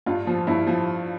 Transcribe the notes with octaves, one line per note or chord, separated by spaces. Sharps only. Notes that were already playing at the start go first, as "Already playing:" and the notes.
G2 F4
F3
G2 E4
F3